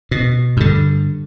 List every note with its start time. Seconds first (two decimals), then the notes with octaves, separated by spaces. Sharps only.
0.11 B2
0.57 G2 D3